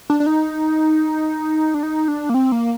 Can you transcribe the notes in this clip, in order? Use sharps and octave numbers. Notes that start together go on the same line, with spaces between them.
D4
D4
D#4
D4
D#4
D4
A#3
C4
A#3